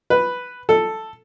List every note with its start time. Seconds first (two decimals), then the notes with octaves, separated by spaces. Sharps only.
0.10 B4
0.69 A4